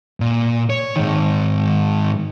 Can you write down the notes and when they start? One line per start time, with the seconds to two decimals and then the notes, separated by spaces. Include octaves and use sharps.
0.20 A#2
0.70 C#5
0.96 G#2 D#3